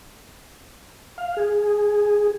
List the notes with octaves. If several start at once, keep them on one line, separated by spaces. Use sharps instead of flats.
F5
G#4